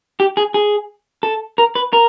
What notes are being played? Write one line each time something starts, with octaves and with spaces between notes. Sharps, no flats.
G4
G#4
G#4
A4
A#4
B4
A#4